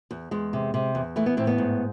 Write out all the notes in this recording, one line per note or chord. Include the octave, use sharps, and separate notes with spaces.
E2
E2 G#3
C3
C3
E2
E3 A3
B3
A2 C4
B3
G#2